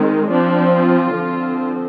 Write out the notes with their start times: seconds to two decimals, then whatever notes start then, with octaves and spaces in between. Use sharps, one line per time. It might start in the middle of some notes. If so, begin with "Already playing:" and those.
Already playing: D#3 G#3 C4
0.29 F3 C4 D4
0.72 F4
1.15 D3 F3 C4